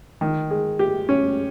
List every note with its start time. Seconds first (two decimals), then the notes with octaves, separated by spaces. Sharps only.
0.21 D#3
0.51 G#3
0.79 G4
1.09 C#4